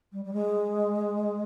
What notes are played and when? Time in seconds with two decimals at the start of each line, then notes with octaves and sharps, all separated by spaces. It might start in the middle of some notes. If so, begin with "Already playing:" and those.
0.12 G3
0.24 G3
0.33 G#3